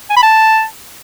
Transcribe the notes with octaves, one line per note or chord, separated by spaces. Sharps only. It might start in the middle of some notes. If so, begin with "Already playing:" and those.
G#5
B5
A5